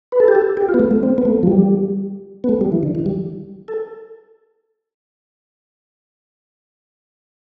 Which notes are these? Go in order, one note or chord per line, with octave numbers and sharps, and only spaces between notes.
B4
A4
G4
A4
G4
F4
B3
A3
A3
C4
B3
A3
F3
G3
B3
A3
G3
E3
D3
E3
G3
A4